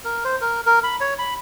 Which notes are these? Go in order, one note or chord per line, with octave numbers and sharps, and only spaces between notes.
A#4
C5
A#4
A#4
B5
C#5
B5